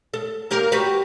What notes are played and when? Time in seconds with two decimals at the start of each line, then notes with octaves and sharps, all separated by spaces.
0.14 A4
0.51 A#3 G4 A#4
0.72 F#4 G4 B4